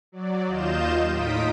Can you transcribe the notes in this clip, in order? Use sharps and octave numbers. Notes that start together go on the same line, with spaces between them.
F#3 D5
D#2 F4 D#5 F5 G6 E7
A2 D#4 F4 D#6 B6 D7